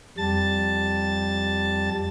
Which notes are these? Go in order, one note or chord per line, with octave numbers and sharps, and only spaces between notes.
F2 G3 A5 A6